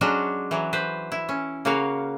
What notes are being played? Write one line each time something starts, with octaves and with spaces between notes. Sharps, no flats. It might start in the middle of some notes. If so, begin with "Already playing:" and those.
F#3 G#3 C#4 D4 F#4
E3 F#3
B4 C5
E4
C#4
C#3 A#3 F#4 C#5 F5